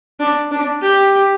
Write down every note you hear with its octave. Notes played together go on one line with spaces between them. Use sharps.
D4
D4
G4